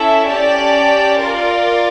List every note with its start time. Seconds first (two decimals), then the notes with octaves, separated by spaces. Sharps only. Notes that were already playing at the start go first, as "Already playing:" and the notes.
Already playing: C#4 E4 A4 E5
0.29 C#4 G4 D5 A5
1.21 F4 A#4 D5